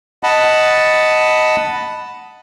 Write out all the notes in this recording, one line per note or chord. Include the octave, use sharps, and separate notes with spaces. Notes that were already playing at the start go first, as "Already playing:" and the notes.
D#5 F#5 A5 B5